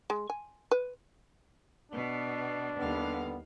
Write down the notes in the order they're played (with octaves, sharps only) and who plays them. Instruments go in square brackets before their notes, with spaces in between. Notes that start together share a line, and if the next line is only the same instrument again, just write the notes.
[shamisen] G#3
G#5
B4
[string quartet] B2 B3 [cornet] D4
[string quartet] D#2 F5 [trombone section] D3 G3 B3